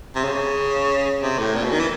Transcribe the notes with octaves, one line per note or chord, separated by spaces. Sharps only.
C3
C#3
C3
A2
A#2
B2
D#3
E3